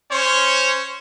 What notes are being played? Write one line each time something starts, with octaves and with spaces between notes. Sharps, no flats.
C#4 C5 C#5